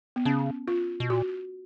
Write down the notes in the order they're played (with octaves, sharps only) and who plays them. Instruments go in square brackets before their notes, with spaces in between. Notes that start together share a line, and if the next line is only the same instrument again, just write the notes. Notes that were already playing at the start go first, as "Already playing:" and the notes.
[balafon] B3
[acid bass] C#3 [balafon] C#4
[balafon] F4
[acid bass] B2
[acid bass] A#2 [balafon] F#4